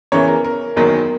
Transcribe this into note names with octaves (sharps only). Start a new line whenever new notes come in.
E2 C#3 E3 A#4 C#5
A#4
A#4
F#1 E2 D#3 F#3